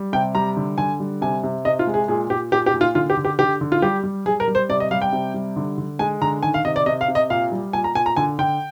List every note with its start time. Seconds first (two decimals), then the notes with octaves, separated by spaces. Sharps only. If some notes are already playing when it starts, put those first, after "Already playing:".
Already playing: G3
0.13 C3 G5
0.35 G3 A#5
0.57 D3
0.78 D3 G#5
1.00 G3
1.21 C3 G#5
1.43 C3
1.65 C3 D#5
1.79 F4
1.87 G#3
1.94 G#4
2.08 A#2 G#4
2.30 A#2 G4
2.52 A#2 G4
2.66 G4
2.74 A#2
2.81 F4
2.95 D3 F4
3.10 G4
3.17 D3
3.25 G4
3.39 D3 G4
3.61 D3
3.72 F4
3.82 G3 G4
4.04 G3
4.26 G3 G#4
4.40 A#4
4.48 G3
4.55 C5
4.69 C3 D5
4.80 D#5
4.91 G3 F5
5.02 G5
5.12 C3
5.34 G3
5.56 D3
5.78 D3
5.99 G#3 G#5
6.22 D3 A#5
6.43 D#3 G#5
6.54 F5
6.65 C3 D#5
6.76 D5
6.86 C3 D#5
7.01 F5
7.08 C3
7.15 D#5
7.30 A#2 F5
7.52 G3
7.73 A#2 G#5
7.84 A#5
7.95 A#2 G#5
8.06 A#5
8.17 D3 G#5
8.39 D3 G5